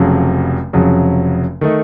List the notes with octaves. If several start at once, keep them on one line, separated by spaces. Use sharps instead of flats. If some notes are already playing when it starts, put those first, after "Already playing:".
Already playing: F1 F2 C#3 F#3
F1 F2 C#3 F#3
D#3 A3 D#4